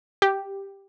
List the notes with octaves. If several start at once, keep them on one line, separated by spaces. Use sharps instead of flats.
G4